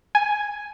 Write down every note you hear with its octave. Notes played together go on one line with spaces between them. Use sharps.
G#5